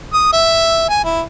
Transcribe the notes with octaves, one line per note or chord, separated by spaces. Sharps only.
D#6
E5
G#5
E4